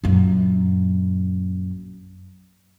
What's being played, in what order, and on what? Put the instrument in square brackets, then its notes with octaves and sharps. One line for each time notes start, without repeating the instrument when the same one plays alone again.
[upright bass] A#1 F#2